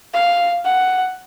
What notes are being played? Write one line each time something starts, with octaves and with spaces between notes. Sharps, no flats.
F5
F#5